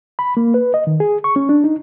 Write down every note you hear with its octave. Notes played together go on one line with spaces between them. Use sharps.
B5
A#3
B4
D#5
D#3
G#4
C#6
C#4
D4
D#4